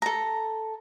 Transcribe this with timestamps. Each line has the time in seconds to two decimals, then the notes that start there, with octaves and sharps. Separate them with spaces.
0.02 A4 A#5